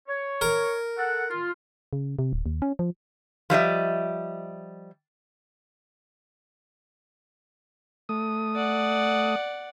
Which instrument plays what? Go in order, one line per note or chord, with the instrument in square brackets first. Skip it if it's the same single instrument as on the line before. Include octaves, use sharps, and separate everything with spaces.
[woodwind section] C#5
[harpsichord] A#4
[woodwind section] A4 F#5
F4
[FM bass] C#3
C3
D1
D#2
C#4
F3
[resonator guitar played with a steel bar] F3 G3 D#5 E5
[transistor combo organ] A3 D#6
[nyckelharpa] D5 F#5